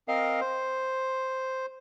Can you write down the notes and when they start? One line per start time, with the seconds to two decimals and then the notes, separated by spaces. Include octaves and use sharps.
0.08 C4 A#4 D#5 F5
0.41 C5